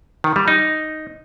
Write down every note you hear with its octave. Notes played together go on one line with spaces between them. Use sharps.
D#3
G3
D#4